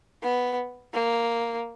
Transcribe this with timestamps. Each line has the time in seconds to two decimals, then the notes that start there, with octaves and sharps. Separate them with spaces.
0.23 B3
0.93 A#3